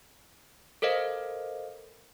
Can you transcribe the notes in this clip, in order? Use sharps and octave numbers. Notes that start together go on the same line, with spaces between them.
A4 A#4 C5 D#5 F5